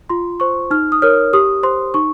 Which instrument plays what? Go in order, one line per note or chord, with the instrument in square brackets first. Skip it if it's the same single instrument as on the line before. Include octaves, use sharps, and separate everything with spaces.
[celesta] F4 C6
C5 C#6
D#4 F6
D#6
A#4 C#5 F6
G4 D#6
C5 C6
D#4 C#6